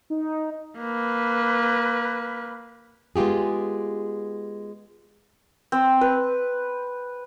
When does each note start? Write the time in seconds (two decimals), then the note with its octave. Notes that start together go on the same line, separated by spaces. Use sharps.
0.10 D#4
0.79 A#3 B4
3.16 G#3 B3 F4 G4 G#4
5.72 C4
6.01 B4